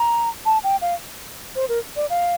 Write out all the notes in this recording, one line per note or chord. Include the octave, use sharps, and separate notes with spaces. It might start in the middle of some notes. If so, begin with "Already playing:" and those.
Already playing: A#5
A5
G5
F5
C5
A#4
D5
F5